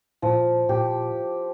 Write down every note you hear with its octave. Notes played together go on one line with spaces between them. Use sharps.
A#2 F3
A#2 G4